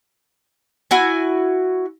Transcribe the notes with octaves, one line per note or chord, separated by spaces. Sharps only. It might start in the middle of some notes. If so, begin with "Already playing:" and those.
E4 F#4 G#5